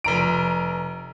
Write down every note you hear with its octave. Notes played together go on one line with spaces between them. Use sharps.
F1 A#5 D7